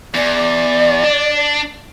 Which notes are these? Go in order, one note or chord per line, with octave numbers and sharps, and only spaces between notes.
E2 D5
D4